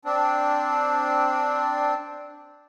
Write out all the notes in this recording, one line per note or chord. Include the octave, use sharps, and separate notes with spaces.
C4 D4